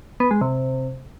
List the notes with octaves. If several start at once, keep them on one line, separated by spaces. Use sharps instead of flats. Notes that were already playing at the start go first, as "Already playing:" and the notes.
B3
G#3
C3